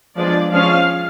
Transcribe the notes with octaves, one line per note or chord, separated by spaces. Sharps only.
F3 G#3 B3 D4 D5
F3 G#3 C#4 F5